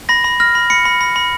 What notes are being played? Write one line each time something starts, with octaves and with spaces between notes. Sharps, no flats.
B5 A#6
B5
F6 A#6
B5
B5 C#7
B5
B5
B5